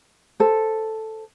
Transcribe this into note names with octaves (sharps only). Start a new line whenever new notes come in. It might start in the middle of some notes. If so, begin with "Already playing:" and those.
A4 C5